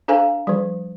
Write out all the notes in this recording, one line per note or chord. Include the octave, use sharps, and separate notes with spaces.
D4 A4 C5 F5 G#5 A#5
F3 G3